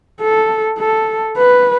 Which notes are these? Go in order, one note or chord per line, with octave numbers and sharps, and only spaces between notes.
A4
A4
B4